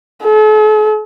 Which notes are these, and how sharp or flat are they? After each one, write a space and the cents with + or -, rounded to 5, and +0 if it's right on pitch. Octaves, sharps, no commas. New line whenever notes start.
A4 -45